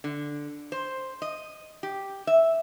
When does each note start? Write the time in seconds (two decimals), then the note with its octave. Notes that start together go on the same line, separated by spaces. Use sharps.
0.04 D3
0.72 C5
1.22 D#5
1.83 G4
2.27 E5